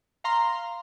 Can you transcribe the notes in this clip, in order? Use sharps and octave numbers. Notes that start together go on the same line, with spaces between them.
F5 A#5 C6